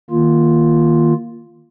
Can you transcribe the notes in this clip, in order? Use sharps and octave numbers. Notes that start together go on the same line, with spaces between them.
D#3 A#3 F4